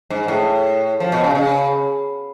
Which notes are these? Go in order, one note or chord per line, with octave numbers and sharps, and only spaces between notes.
G#2
A2
F3
B2
C#3
C#3